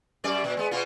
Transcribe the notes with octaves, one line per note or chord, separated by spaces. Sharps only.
F#2 F#3 D5
A#2
G#3 B3
B2 B3 F4